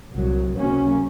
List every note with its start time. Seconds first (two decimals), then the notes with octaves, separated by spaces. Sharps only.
0.13 C2 A#2 F#3
0.55 C#2 C3 F#3 A#3 C#4